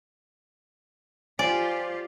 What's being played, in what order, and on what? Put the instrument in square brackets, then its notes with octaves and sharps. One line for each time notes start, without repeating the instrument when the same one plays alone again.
[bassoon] F3 [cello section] F4 G4 [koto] D5 [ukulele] G#5